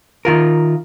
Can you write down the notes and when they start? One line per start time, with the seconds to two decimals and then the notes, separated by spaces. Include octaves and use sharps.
0.25 D#3 F4 A#4